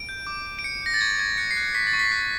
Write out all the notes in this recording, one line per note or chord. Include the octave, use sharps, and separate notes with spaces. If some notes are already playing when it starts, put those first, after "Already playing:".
Already playing: D7
G6
D6
D6
D7
G6 C#7
G6 A#6
A6
C#6 G#6
C#6 G#6
F#6 C#7
C7
F#6
C#7
C#6 B6
A6
C#6
B6
F#6 C7